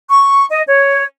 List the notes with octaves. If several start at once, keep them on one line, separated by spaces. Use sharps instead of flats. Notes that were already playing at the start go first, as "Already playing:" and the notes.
C#6
D#5
C#5